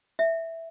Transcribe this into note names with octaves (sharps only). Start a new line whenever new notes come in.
E5